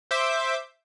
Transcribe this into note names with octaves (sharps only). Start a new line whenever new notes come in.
C5 E5 D6 G6